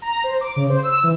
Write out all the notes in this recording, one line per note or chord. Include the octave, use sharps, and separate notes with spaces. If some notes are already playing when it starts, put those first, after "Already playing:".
A#5
C5
D6
C#3
C5
E6
E3